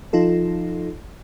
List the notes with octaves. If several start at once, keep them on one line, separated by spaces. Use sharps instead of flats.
F3 D#4 F4 A4